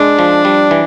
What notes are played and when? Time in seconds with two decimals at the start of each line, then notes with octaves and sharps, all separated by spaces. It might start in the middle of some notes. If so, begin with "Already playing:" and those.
Already playing: G#3 D4
0.19 F3
0.45 G3
0.71 E3